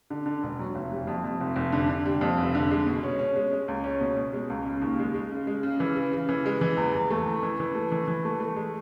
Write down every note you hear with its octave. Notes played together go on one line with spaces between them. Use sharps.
D3
D3
E1
F#3
F1
G3
F2
F2
F1
F1
D3
D3
G3
F2
F1
D3
G#3
B2
C#4
C#4
G#3
G#3
C#2
C#4
B2
B2
G#3
C#2
C#3
D#2
G#3
G#3
C#3
G#3
C#3
E3
C#3
C#3
E3
G#3
E3
E2
E2
A3
E3
E3
E3
A3
E3
E3
A3
A3
G#3